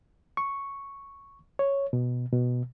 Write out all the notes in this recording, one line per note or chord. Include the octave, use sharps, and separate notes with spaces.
C#6
C#5
B2
B2